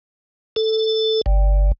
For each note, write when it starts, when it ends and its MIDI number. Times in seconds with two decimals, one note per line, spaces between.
0.56 1.21 69
1.26 1.72 31